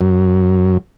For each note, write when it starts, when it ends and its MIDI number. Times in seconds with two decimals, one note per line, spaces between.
0.01 0.78 42